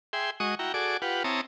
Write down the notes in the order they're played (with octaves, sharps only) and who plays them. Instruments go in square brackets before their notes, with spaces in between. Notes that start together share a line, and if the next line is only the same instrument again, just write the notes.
[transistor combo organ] G#4 E5 G5 C6
G#3 F#4 D#5 C#6 D#6
E4 F#4 G5 A#5
F#4 G#4 A4 D5 D6
F4 G4 B4 F#5
C4 E4 C#5 A5 A#5 D#6